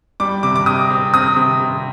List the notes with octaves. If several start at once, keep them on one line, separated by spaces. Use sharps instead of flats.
G3 D6
C3 D6
D6
C3 D#6
C4
C4 D#6
C3
C3